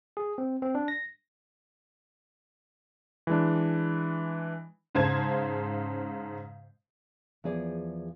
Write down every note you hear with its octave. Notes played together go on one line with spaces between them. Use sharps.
G#4
C4
C4
D4
A#6
E3 G#3 D4
G#2 C#3 C5 A5 G#6
E2 F3 G#4 D5